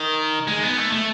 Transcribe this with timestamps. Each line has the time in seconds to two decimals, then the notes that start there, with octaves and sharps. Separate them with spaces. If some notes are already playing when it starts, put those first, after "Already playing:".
Already playing: D#3
0.48 G#3
0.63 B3
0.78 A3
0.92 A3